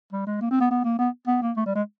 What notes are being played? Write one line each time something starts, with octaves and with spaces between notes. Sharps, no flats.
G3
G#3
A#3
C4
B3
B3
A#3
B3
B3
A#3
A3
G3
G#3